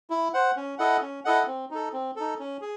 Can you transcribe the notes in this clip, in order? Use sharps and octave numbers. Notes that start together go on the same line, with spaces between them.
E4
C5 F#5
C#4
E4 A4 D#5 F#5
C#4
E4 A4 D#5 F#5
C4
D#4 A4
C4
D#4 A4
C#4
G#4